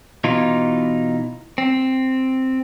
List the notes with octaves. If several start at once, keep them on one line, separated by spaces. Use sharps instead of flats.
B2 E3 D#4 F4
C4